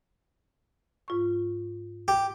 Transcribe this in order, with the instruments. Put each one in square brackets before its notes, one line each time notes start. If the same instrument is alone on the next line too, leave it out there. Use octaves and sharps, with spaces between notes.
[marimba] G#2 F4 C#6
[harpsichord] G4